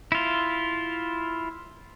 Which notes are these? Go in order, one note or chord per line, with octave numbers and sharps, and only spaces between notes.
E4 F4